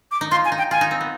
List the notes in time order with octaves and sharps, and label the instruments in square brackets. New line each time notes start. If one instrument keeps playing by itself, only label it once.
[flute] D6
[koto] D#4
[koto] F4 [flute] C6
[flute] G#5
[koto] D#4
[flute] G5
[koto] F4 [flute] G#5
[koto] D#4
C4
B3